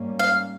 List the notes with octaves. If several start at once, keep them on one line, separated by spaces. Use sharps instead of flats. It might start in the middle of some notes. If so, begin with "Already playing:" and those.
Already playing: G#2 G3 A#3 C#4
F5